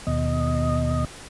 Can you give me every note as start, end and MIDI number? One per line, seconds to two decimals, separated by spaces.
0.07 1.04 39
0.07 1.04 47
0.07 1.04 75